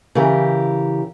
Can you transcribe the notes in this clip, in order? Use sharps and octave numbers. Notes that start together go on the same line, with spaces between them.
C#3 E3 G4 A#4